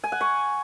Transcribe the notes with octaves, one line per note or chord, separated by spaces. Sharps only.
G#5
F#5
C#6